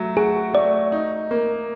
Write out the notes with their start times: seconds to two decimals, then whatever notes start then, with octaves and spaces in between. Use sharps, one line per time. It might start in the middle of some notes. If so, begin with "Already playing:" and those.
Already playing: F#3 A3
0.17 F#4 G#4
0.54 A3 D5
0.92 D#4
1.31 A#3